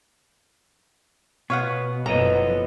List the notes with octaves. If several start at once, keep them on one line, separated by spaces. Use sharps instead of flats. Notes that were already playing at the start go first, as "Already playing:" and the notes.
B2 B3 C#5 F5 F#5
F#1 F3 B3 A4 C#5 D#5 A#5